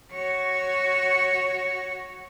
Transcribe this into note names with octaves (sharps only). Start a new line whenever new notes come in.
F#4 C#5